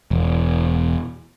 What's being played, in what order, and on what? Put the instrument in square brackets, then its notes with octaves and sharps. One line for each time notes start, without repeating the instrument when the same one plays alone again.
[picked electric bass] E1